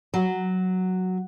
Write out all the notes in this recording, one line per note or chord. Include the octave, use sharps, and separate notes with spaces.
F#3